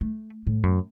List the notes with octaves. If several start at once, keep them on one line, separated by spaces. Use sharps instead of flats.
A3
A2
F#2